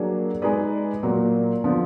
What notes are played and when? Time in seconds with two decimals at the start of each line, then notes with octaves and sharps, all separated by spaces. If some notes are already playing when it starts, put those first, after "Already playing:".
Already playing: F#3 A#3 D4 G#4
0.42 G#3 D#4 G#4 B4 D5
1.03 A#2 F#3 A#3
1.64 D3 F3 B3